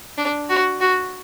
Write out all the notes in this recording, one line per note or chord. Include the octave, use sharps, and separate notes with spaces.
D4
F#4
F#4